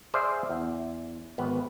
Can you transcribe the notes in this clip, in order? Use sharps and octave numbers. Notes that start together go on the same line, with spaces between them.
G#4 C5 D5 E5 F5
E2
G#1 B3